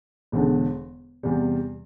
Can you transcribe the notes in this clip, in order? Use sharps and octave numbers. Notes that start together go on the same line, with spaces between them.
E1 E2 D3
E2 C3 G3